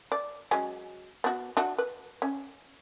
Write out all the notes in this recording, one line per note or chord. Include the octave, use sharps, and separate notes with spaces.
D5
F#3 G#3 C#4
B3 F#4
D4 F#4 F#5
B4
C#4